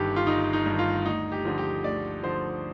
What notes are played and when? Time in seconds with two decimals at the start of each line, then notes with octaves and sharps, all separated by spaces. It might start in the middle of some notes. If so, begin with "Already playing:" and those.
Already playing: G1 G2 D#3 G4
0.16 F4
0.26 G1 D#4
0.53 D#4
0.66 G2 D#3
0.79 F4
1.05 D2 D#4
1.32 G4
1.45 D3 F3
1.58 G4
1.84 D2 D5
2.23 D3 F3 C5